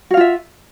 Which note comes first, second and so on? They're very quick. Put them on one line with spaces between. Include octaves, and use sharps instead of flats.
F#4 F5 F4 E5